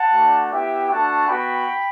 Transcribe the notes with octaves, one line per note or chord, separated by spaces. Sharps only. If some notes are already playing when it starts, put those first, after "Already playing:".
Already playing: F#5 A5
A3 D4 F#4
B3 E4 G4 E5 G5
A3 D4 F#4 F#5 A5
B3 F#4 G5 B5